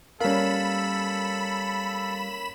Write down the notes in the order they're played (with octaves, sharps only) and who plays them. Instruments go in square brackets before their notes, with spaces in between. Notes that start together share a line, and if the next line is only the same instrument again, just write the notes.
[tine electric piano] G3 F5 [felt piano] A#3 C#4 [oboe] A4 [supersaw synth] B5 E7